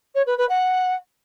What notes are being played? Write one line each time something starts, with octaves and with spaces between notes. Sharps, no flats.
C#5
B4
B4
F#5